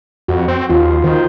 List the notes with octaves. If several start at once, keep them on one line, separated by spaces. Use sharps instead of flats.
F2 F#4
C4
D#2 F4
D#3 C5